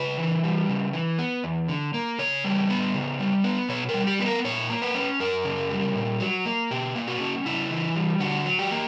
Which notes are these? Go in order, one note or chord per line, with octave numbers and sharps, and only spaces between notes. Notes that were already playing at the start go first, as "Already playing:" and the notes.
Already playing: C#3 B4
E3
G3
C#3
E3
B3
E2
D3
A#3
C#3 C#5
G3
B3
C#3
G3
B3
B2 C#5
A#4
G3
G4
B3 B4
A#4
A#2 C#5
A#3
B4
C#4
F#2 A#4
C#3
G3
A#2
F#3
A#3
B2 G4
A#3
F#4
C#4
C#3 E4
E3
G3
D3 F#4
F#3
G4
A#3